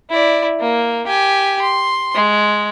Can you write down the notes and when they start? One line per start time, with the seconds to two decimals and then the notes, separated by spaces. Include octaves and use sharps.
0.10 E4 D5
0.60 A#3
1.07 G4 G#5
1.62 C6
2.15 G#3